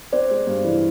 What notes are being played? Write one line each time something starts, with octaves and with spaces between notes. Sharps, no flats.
C4 C5 D5
G#3
G2
E3